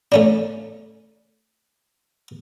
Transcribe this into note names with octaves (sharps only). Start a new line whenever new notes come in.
A3 C#4 D4